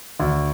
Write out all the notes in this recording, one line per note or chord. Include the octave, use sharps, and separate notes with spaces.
D2